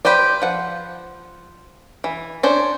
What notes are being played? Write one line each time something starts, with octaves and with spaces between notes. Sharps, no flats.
G4 B4 C5 D5
F3 F#5
E3
C#4 D4 C5